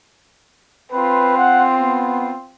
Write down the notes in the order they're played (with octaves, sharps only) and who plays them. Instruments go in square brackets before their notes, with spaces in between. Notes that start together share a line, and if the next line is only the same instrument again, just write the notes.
[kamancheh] C4 F4 [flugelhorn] B4
[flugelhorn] F#5
B3